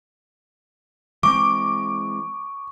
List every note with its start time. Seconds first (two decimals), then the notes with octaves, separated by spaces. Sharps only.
1.23 E3 G#3 C4 C#6 D6